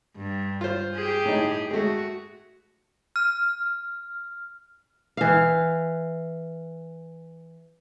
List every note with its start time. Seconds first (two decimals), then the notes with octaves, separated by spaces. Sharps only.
0.16 G2
0.61 F4 C5
0.95 G4 G#4
1.25 A2 D#4
1.71 G#3 A3 F#4
3.16 F6
5.17 E3 F5